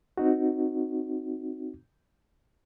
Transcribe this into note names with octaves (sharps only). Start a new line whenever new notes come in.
C4 D#4 F#4